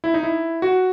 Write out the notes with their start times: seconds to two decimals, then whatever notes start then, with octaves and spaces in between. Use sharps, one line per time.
0.04 E4
0.14 D#4
0.23 E4
0.62 F#4